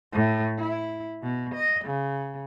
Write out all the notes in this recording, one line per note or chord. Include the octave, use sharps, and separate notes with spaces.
A2
E4
B2
D#5
C#3